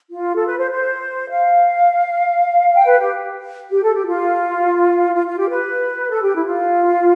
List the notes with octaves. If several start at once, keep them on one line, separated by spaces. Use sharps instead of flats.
F4
A4
B4
C5
C5
F5
G5
B4
G4
G4
A4
G4
F4
F4
F4
G4
B4
A4
G4
E4
F4